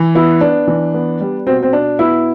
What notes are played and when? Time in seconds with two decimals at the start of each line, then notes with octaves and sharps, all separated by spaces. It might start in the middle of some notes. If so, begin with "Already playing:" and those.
Already playing: E3
0.15 B3 E4
0.41 B3 D4
0.67 E3
0.94 B3
1.20 G3
1.46 B2 C4
1.63 C4
1.73 B2 D4
1.99 B3 E4